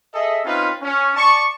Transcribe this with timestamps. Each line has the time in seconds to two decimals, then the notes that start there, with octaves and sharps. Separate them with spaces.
0.14 G#4 A4 D#5 E5
0.46 C4 C#4 D#4 F4 B4
0.82 C#4
1.16 D5 A5 C#6